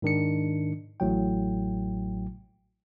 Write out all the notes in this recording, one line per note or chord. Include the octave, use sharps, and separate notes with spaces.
G#2 D#3 D4 C#7
A1 A2 F#3 G5